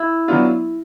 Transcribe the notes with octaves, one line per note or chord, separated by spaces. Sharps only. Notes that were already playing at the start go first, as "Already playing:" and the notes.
Already playing: E4
F#3 B3 D4 F4